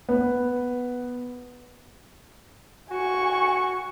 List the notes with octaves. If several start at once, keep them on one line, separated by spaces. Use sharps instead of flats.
B3
F#4 G#5 C#6